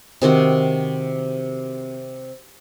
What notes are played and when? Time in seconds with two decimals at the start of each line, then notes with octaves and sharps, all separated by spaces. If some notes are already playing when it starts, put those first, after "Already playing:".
0.22 C3 D#3 C4 F#4